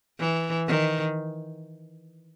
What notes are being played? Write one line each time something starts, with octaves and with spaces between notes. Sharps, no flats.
E3
D#3